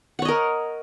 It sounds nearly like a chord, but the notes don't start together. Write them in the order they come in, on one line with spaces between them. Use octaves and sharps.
F#5 C#5 D#5 A#4